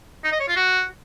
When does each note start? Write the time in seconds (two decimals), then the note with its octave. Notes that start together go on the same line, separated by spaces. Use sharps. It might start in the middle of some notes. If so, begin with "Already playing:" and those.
0.24 D#4
0.32 D#5
0.40 C#5
0.48 F4
0.56 F#4